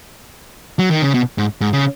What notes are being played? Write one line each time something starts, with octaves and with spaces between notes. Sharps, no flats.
F#3
D#3
C#3
B2
G#2
G#2
C#3